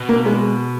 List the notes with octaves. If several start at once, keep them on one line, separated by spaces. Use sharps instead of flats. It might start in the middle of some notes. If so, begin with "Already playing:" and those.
Already playing: B2
A#3
G#3